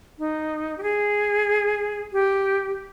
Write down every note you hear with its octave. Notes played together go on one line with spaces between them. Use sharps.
D#4
G4
G#4
G4